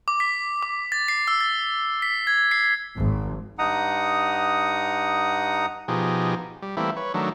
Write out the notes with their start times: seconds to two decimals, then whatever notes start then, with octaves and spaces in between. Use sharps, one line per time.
0.08 D6
0.20 B6
0.62 D6
0.92 A6
1.08 C7
1.28 E6
1.41 A6
2.02 B6
2.27 G#6
2.51 C7
2.96 G#1
3.59 G2 D#4 F#5 A#5 D#6
5.88 B2 F3 D#4 G4 G#4
6.62 G3
6.77 E3 G3 A3 A#3 C4 E4
6.97 B4 C#5
7.14 D#3 F#3 A3 D4